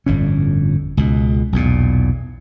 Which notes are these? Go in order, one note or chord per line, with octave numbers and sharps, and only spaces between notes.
G1 F2 A2 C#4
C#2 B2
B1 E2 A#2